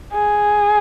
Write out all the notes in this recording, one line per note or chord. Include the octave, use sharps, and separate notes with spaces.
G#4